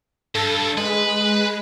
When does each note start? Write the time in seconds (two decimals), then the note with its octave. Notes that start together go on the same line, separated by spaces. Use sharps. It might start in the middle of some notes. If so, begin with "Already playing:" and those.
0.35 G2 A4
0.77 G#3 B4